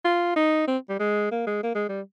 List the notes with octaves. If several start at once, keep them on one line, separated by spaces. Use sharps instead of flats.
F4
D#4
C4
G3
G#3
A#3
G#3
A#3
G#3
G3